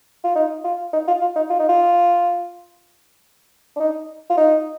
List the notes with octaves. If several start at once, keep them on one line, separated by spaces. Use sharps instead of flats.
F4
D#4
F4
D#4
F4
F4
D#4
F4
D#4
F4
D4
D#4
F4
D#4